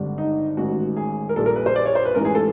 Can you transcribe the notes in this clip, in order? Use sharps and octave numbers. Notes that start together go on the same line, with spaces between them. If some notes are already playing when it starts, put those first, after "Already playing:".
Already playing: G#1 G2 D3 G3
D#4
A1 G#2 D#3 F#4
G#4
A#4
A#1 A#2 G3 A4
A#4
B4
C5
D5
C#5
C5
B4
A1 G#2 E3 A#4
G#4
A4